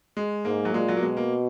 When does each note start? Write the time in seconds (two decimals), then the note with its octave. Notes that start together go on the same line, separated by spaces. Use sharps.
0.17 G#3
0.45 G#2 A#3
0.65 F#3
0.73 A#2 G#3
0.88 F#3
0.96 A#3
1.02 B2 G#3
1.17 A#3